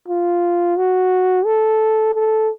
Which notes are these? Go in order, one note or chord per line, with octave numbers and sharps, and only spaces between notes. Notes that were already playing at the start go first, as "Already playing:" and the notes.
F4
F#4
A4
A4